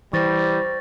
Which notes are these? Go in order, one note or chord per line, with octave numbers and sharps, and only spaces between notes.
E3 G3 C5 C#6 A6 A#6